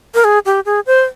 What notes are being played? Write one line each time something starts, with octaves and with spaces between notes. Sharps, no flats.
A#4
G#4
G4
G#4
C5